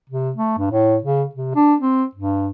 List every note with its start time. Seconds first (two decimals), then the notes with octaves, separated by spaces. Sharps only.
0.10 C3
0.36 A3
0.58 G2
0.71 A2
1.02 C#3
1.35 C3
1.55 D4
1.80 C4
2.15 G2